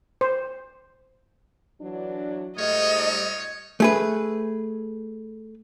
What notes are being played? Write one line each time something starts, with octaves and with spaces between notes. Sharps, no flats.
C5
E3 F#3 D4
G#2 G3 A3 D#4 F4 C#5 D#5
A3 G#4 B4